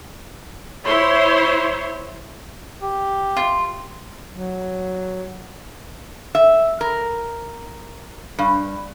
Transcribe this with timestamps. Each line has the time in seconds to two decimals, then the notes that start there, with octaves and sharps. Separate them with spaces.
0.86 E4 C5 C#5 C6
2.82 G4
3.37 F4
4.31 F#3
6.35 E5
6.81 A#4
8.39 G2